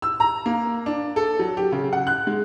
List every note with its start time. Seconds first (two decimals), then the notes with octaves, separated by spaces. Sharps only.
0.02 E6
0.20 A#5
0.46 A#3
0.86 D4
1.16 A4
1.39 F#3
1.57 G4
1.72 C#3
1.93 F#5
2.07 F#6
2.27 G#3